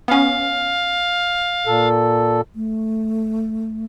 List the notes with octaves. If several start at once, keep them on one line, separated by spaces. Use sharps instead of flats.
B3 C#4 F5
A#2 A4
A3